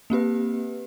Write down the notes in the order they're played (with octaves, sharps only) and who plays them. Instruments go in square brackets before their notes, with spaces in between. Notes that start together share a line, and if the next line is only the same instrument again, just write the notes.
[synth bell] A#3 C4 G4 B4